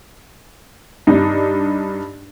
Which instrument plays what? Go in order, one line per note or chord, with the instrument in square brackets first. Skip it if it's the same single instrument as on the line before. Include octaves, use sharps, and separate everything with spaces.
[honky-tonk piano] G2 D4 D#4